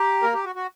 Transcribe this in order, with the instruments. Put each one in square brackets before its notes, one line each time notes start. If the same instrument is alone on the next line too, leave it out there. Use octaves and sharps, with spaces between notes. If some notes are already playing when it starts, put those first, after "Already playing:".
Already playing: [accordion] G4 [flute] A#5
[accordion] A#3 A#4
G4
F#4
F#4